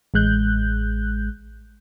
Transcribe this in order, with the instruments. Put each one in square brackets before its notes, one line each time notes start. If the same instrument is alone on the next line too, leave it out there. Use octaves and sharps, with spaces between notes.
[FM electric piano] A1 G#3 F#6 G6